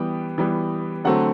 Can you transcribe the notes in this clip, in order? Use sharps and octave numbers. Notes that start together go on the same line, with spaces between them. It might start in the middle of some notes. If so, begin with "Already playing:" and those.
Already playing: E3 G3 B3 G5
E3 G3 B3
D3 F#3 A3 C4 F#5